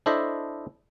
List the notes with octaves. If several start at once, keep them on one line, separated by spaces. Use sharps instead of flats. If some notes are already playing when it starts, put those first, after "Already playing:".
D4 E4 A4 C5 D#5 E5